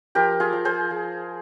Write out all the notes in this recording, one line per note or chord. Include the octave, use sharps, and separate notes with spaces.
F3 G4 A#4
F4 G#4
F3
G#4 C5
F3